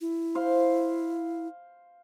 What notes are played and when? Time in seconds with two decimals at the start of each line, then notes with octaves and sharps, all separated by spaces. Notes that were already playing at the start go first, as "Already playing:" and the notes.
0.01 E4
0.35 C5 F5